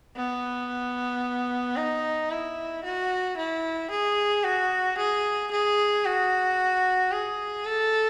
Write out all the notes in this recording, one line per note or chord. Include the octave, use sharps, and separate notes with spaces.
B3
D#4
E4
F#4
E4
G#4
F#4
G#4
G#4
F#4
G#4
A4